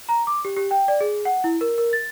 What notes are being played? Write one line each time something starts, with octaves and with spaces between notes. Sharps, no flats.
A#5
D6
G4
G4
G5
D5
G#4
F#5
E4
A#4
A#4
A6